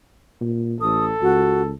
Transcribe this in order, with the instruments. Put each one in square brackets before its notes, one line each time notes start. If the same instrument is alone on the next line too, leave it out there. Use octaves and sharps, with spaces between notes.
[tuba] A#2
[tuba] A1 [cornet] A4 [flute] D#6
[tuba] C#2 [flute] F#4